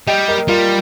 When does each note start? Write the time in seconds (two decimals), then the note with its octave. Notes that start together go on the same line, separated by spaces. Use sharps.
0.07 G3 D#5 G5
0.28 A#4 D#5
0.48 G3 F4 A#4